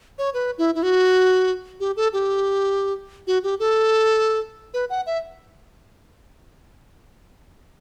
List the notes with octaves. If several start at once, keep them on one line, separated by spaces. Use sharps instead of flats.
C#5
B4
E4
E4
F#4
G4
A4
G4
F#4
G4
A4
B4
F#5
E5